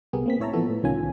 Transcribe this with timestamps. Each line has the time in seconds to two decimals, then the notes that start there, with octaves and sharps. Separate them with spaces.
0.13 C2 B3 G4 G#4 A#4
0.26 A#3 C4 B6
0.39 A2 E4 C#5 E5 A5 A#5
0.53 E3 F3 B3 A4
0.69 A2
0.83 C2 D#3 C#4 F4 G#5